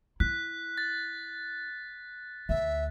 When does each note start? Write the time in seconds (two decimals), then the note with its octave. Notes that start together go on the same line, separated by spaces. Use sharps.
0.20 E4 F#6 B6
0.78 A6
2.49 D2 E5